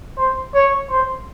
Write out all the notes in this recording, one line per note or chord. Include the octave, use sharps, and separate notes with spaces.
C5
C#5
C5